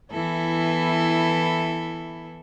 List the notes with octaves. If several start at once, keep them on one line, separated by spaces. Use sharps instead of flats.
E3 B3 E4 A4